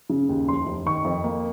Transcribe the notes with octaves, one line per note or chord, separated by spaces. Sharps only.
C#3
D#2
F1 C6
F1
D#3 C#6
F2
A#3